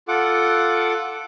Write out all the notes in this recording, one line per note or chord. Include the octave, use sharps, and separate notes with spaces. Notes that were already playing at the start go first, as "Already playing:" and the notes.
F4 A4 F#5 D6